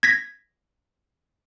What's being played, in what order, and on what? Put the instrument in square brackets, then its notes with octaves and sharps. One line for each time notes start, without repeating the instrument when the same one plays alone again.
[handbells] G#6 A#6 B6